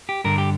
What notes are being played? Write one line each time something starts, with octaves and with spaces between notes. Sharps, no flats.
G4
G2 D3 A#4
G4